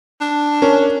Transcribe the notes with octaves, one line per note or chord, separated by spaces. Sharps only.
D4
C#4 A#4